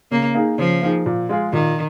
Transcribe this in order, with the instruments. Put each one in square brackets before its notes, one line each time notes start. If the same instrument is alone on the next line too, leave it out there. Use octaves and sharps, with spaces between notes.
[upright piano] C#3 [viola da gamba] A#3
[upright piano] A#3 D#4 G#4
[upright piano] C#3 [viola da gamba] F3
[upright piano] A#3 D#4 G#4
A#2
G#3 F4 G#4
[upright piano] A#2 [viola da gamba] D#3